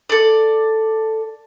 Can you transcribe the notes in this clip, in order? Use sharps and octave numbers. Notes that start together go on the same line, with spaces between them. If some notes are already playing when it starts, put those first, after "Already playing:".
A4 D5